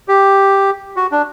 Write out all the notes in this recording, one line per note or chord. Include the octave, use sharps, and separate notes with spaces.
G4
F#4
D4